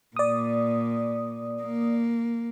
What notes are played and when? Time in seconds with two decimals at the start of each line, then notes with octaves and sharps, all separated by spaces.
0.16 A#2 D5 D#6
1.62 A#3